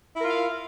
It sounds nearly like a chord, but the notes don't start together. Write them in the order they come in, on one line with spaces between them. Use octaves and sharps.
E4 A#4 F4 F5